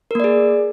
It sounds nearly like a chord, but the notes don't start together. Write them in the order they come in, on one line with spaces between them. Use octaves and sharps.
A#4 A#3 D5 G#4